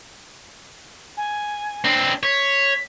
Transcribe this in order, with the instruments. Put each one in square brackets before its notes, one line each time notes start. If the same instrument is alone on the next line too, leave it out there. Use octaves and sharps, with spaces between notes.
[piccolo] G#5
[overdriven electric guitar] C4 D4
[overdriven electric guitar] C#5 [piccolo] B6